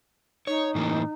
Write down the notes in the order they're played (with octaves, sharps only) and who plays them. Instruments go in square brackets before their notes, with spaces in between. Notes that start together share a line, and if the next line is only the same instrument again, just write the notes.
[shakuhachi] D#4 [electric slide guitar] C#5
[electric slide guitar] A2 E3 A#3